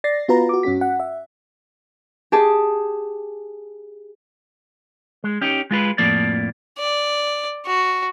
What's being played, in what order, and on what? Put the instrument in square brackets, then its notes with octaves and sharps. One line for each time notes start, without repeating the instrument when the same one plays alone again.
[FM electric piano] D5 A6 A#6 C7
B3 F4 F#4 B4 A#5
F#4 D6
G2 C#4 F#4 B6
F#5
E5
[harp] G4 G#4 A5
[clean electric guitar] G#3
C#4 D#4 G4
G#3 F4 B4
F2 A2 F3 A#3 D5
[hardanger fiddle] D5
F#4